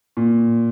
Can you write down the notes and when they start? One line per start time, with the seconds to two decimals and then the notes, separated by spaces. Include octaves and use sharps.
0.17 A#2